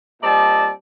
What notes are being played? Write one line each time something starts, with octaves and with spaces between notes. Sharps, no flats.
A#2 G3 C4 D5 D#5 A5